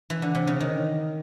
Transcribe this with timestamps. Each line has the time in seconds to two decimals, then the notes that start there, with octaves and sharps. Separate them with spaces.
0.10 E3
0.22 D3
0.35 C3
0.47 C#3
0.60 D#3